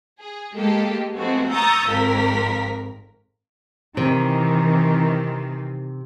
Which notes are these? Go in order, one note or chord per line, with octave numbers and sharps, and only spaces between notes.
G#4
G#3 A#3 G4 A4
F3 G#3 A3 B3 C4 F#4
A#5 C#6 D#6 E6 G6 A6
G#1 F2 A#4 B6
C3 D#3 E3 C4